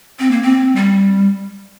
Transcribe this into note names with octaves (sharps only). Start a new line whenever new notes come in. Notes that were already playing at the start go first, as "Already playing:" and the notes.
C4
A#3
C4
G3